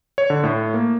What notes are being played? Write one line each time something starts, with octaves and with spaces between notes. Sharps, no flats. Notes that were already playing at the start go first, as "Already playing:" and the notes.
C#5
D3
A2
A#3